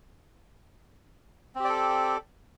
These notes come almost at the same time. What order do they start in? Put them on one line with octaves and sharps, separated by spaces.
C4 G4 D5 A4